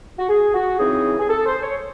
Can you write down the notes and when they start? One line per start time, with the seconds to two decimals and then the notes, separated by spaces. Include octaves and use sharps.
0.19 F#4
0.29 G#4
0.54 F#4
0.79 C#3 E3 C4 D#4 G#4
1.20 G#4
1.30 A4
1.46 C5
1.63 C#5